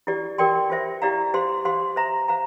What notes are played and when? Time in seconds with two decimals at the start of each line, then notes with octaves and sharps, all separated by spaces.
0.07 E4 G4 D5
0.38 G4 A#4 D5 G5 C6
0.70 F4 C5 E5
1.02 E4 G4 D5 F5 A#5
1.34 G4 C5 F5 C6
1.65 G4 C5 F5 C6
1.96 C5 E5 A#5
2.28 C5 F5 A#5